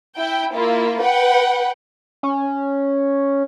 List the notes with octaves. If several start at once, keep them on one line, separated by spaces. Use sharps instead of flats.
E4 G5
A#3 E4 F4
B4 F#5 G5
C#4